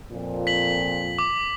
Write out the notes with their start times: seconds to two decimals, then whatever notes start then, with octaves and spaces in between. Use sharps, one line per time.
0.12 F2 A#2
0.47 B6 F#7
1.19 D6